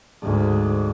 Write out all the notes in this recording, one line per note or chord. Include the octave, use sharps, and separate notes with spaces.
D2 G#2